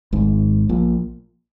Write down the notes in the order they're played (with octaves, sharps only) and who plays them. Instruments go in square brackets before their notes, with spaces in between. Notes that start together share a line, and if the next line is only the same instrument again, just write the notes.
[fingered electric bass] G#1 G#2
A#1 A#2